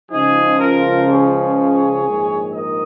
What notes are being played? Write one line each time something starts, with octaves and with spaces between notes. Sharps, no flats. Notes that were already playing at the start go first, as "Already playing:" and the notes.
C#2 C#3 F3 D#4 G#4
F4 A#4
G#4 C#5
A#1 G#2 D#3
A#4 D#5